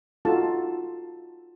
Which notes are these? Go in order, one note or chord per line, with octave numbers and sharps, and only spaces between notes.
D#4 F4 F#4 A4 A5